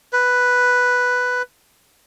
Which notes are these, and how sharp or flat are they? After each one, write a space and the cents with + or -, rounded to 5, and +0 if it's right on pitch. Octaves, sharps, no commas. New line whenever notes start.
B4 +0